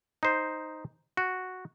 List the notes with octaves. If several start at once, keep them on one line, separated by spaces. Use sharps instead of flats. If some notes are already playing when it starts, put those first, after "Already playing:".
D#4 C5
F#4